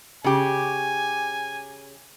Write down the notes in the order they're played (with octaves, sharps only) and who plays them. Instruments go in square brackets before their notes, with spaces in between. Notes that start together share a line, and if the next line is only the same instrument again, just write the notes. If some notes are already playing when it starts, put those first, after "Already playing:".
[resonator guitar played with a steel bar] C#3 G4 [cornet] G#5